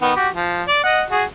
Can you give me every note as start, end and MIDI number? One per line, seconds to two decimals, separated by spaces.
0.02 0.14 51
0.02 0.14 59
0.16 0.28 66
0.16 0.28 67
0.34 0.63 53
0.68 0.81 74
0.84 1.02 75
0.84 1.02 78
1.10 1.24 66
1.10 1.24 68